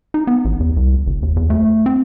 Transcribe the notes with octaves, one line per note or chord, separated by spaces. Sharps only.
D#4
B3
A1
E2
C2
F#1
D#2
E2
A3
C4